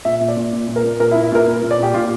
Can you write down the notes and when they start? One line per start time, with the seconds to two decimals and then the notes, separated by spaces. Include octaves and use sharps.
0.05 A#2 E5
0.20 A#2
0.28 D5
0.36 A#2
0.52 A#2
0.68 A#2
0.76 A#4
0.84 A#2
1.00 A#2 A#4
1.11 E4
1.15 A#2
1.23 E4
1.32 A#2 A#4
1.47 A#2
1.63 A#2
1.71 D5
1.79 A#2 G4
1.94 A#2 F4